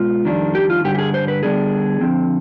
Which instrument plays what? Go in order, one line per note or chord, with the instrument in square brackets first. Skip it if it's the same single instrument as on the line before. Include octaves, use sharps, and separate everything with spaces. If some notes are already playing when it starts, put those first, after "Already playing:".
Already playing: [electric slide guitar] B2 G#3 B3 F4
F2 D#3 G3 D4
G4
F4
G2 D3 G3 G4
G4
G#4
C5
B4
D3 G3 B3 D4 G#4
D3 F3 C4